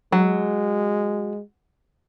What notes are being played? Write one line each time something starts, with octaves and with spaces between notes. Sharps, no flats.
F#3 G#3